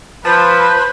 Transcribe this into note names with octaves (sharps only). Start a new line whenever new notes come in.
F3 B4 C5 A5 B5